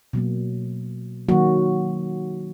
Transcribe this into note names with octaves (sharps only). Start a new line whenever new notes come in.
B2 F#3 A#3
D#3 F#3 A#3 F#4